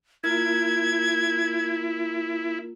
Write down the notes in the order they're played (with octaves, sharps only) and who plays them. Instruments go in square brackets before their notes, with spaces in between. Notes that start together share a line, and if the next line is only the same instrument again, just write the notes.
[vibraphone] A#3 F4 A#4 [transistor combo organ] E4 [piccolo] G#6